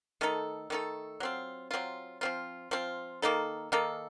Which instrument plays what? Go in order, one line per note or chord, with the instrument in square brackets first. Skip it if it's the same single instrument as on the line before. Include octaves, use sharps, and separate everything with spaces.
[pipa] D#3 A3 D#4 A4
D#3 A3 D#4 A4
F#3 C4 F4
F#3 C4 F4
F3 C4 F4
F3 C4 F4
D#3 A#3 D#4 A4
D#3 A#3 D#4 A4